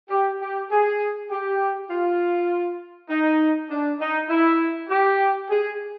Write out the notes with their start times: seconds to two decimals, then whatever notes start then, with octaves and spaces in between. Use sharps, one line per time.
0.10 G4
0.40 G4
0.71 G#4
1.31 G4
1.90 F4
3.10 D#4
3.70 D4
4.00 D#4
4.29 E4
4.89 G4
5.50 G#4